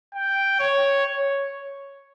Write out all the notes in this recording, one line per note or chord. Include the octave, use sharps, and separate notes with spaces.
G5
C#5
C#5